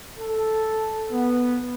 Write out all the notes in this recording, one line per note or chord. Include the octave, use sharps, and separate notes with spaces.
A4
B3